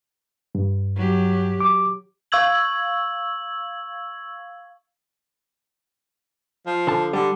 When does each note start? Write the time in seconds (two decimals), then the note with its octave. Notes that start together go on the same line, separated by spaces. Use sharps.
0.55 G2
0.96 F#3 G4
1.60 D6
2.32 F5 C#6 E6 G#6 F#7
6.66 F3
6.87 D3 A5
7.13 D3 G3